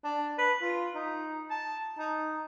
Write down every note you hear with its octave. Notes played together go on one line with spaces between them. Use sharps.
D4
B4
F4
D#4
A5
D#4